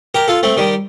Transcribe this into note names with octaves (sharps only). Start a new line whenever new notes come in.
G4 A#4
F4 A4
A3 C4
D#3 G3